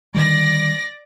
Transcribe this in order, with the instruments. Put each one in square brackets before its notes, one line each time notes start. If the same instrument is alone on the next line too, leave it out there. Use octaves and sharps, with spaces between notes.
[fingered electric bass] D3 D#3 G3 [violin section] D5 A#6